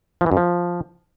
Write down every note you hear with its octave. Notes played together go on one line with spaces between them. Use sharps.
F3
E3
F#2
F3